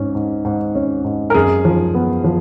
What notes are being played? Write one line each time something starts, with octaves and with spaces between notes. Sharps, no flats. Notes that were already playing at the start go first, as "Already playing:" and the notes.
Already playing: G#2 C#4
G#2
G#2
C#4
G#2
A#4
F#2 G#4
F3
B3
F3